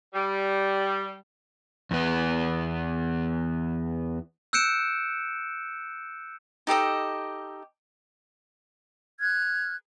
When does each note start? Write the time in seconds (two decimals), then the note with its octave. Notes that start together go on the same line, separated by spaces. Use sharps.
0.14 G3
1.91 E2 B3
4.53 E6 F#6 G6 C#7 D7 E7
6.67 D#4 G4 A4 D#5
9.20 F6 F#6 G#6